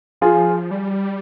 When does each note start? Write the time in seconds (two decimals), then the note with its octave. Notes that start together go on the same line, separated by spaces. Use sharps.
0.21 F3 F4 G#4
0.71 G3